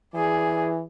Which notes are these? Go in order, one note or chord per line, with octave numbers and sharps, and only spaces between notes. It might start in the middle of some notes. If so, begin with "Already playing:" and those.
E3 G#4 D5